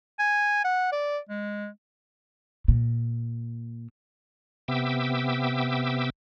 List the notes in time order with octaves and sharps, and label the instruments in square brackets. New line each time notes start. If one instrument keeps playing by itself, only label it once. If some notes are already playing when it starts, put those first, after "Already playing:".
[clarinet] G#5
F#5
D5
G#3
[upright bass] A#2
[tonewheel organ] C3 B3 E5 G5 D6 E6